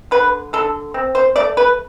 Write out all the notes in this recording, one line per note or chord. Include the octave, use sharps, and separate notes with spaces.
D3 B4
D3 A4
C4
C5
A3 D5
B4